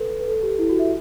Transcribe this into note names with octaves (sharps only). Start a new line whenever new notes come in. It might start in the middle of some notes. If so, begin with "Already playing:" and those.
Already playing: A4 B4
B4
A4
G4
E4
F#4
E5